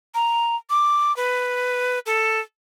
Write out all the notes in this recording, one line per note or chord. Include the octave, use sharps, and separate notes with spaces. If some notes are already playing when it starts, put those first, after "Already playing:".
A#5
D6
B4
A4